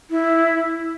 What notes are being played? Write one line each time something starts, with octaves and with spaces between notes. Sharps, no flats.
E4